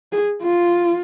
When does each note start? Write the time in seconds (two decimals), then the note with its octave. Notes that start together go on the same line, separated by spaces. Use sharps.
0.12 G#4
0.42 F4